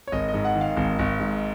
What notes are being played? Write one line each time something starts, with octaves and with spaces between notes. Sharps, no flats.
C#5
G#1 D#5
D#5
G#2
F#5
D#3
F5
G#1
G#1
G#2